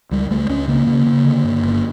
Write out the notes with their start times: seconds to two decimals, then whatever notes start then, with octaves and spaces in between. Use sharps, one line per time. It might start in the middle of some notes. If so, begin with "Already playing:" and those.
0.11 C#2 G3
0.30 C#2 A3
0.49 C#2 C#4
0.68 C#3 A#3
0.87 C#3
1.06 C#3
1.25 D3
1.44 G2
1.63 G1